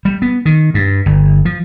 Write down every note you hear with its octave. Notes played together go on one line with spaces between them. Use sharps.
G3
B3
D#3
G2
G1
F3